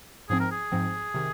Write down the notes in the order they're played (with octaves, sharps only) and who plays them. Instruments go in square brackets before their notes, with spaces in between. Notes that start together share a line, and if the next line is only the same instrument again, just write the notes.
[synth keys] G#2 F3 C4 [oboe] G#4
[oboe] A#4
G#4
[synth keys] G#2 F3 C4
C3 D#3